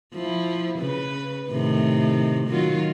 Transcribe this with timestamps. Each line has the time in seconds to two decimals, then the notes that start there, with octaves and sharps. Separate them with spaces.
0.14 F3 E4
0.79 C#3 B4
1.50 A2 C3 D#3
2.47 D#3 F#3 F4